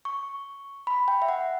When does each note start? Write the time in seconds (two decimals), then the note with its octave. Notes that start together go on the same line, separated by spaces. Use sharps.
0.05 C#6
0.87 B5
1.08 G5
1.22 E5
1.28 F#5